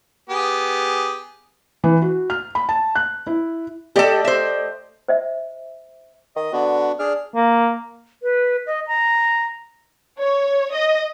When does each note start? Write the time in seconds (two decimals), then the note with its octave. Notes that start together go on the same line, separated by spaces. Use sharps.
0.30 B3 G4 G#4
1.84 E3
2.02 F#4
2.30 F6
2.55 B5
2.69 A5
2.95 F#6
3.27 E4
3.96 A3 G4 A4 D5 D#5
4.24 C5 E5
5.08 C5 D#5 E5
6.36 D#3 D#5
6.53 D3 B3 D4 F#4
6.99 D4 G#4 F6
7.35 A#3
8.23 B4
8.67 D#5
8.87 A#5
10.21 C#5
10.75 D#5